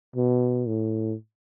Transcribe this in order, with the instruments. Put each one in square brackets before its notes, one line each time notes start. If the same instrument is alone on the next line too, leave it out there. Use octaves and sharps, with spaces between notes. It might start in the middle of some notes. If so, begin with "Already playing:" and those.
[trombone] B2
A2